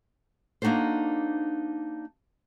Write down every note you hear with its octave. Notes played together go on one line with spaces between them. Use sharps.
A#3 D4 D#4 F#4 A4 C5